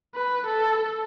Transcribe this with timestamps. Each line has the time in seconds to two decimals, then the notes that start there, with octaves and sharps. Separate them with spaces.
0.15 B4
0.46 A4